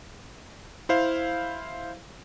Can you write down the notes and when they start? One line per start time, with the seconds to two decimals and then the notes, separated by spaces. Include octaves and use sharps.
0.89 E4 C5 F5